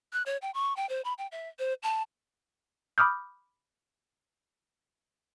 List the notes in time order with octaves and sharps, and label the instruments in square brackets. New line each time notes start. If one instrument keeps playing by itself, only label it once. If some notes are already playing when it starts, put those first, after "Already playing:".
[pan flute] F#6
C#5
G5
C#6
G5
C5
B5
G5
E5
C5
A5
[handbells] B5 D6 D#6 F6 G6